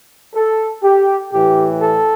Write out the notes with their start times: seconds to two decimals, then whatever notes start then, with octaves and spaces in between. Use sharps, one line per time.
0.34 A4
0.82 G4
1.32 A2 E3 G4
1.80 A4